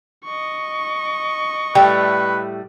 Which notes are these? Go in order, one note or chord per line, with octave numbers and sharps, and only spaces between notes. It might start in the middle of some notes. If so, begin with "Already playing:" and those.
D#5 C#6
A2 G3 A3 B4 G5